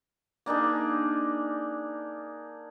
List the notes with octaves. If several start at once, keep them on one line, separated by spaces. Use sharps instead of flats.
A#3 D4 D#4 G#4